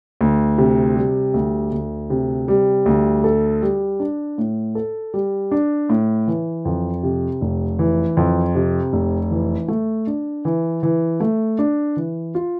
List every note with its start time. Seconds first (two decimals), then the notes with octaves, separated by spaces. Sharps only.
0.21 D2
0.58 C3
0.96 G3
1.34 D2
1.72 D2
2.10 C3
2.48 G3
2.86 D2
3.24 A4
3.62 G3
4.00 D4
4.38 A2
4.75 A4
5.14 G3
5.51 D4
5.89 A2
6.28 E3
6.65 F2
7.03 C3
7.41 F1
7.79 E3
8.17 F2
8.55 C3
8.93 F1
9.31 E3
9.68 A3
10.07 D4
10.45 E3
10.83 E3
11.20 A3
11.59 D4
11.97 E3
12.35 F4